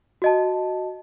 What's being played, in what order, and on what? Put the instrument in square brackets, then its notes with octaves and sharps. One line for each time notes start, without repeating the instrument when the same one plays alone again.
[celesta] F#4 D#5 A5